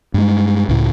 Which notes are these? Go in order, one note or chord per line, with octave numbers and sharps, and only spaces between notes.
G2 G#3
C#2 A2